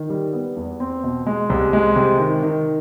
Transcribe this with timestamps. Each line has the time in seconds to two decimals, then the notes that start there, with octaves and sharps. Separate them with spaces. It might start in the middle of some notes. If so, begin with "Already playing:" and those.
Already playing: D#3
0.10 G3
0.33 B3
0.57 E2
0.80 C4
1.04 B2
1.26 G#3
1.50 C2
1.73 G#3
1.96 C3
2.19 D#3
2.43 D#3